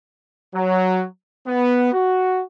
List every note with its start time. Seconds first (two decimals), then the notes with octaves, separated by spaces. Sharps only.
0.55 F#3
1.47 B3
1.93 F#4